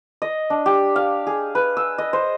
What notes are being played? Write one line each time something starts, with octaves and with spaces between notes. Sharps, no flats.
D#5
D4
G4
F5
G#4
B4
E6
D#5
C5